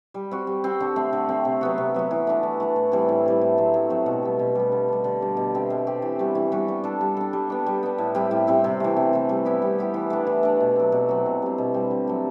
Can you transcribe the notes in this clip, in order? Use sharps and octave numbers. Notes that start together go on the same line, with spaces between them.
G3
C4 F#4
G3
C4 F#4
D3
A3 C4
D3
A3 C4
C3
F#3 B3 F#4
C3
F#3 B3 F#4
E3
A3 D4 F#4
E3
A3 D4 F#4
A2
E3 G3 C4
A2
E3 G3 C4
A2
F#3 A3 C4
A2
F#3 A3 C4
B2
G3 B3
B2
G3 B3
D3
G3 D4
D3
G3 D4
B2
A3 C4 G4
B2
A3 C4 G4
E3
G3 B3 F#4
E3
G3 B3 F#4
G3
D4 A4
G3
D4 A4
G3
B3 D4
G3
B3 D4
A2
G3 C4 E4
A2
G3 C4 E4
C3
E3 A3
C3
E3 A3
G3
B3 E4 G4
G3
B3 E4 G4
E3
A3 D4
E3
A3 D4
B2
F#3 C4
B2
F#3 C4
B2
G3 C4
B2
G3 C4
D3
F#3 A3